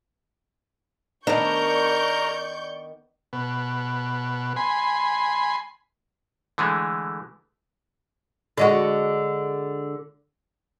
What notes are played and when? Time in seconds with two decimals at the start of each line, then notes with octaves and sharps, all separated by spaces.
1.27 D#3 B3 D4 A#4 D5 C#6 G6
3.33 B2
4.56 G#5 B5 C6
6.58 D3 E3 G#3 A3
8.57 D3 G#3 F#4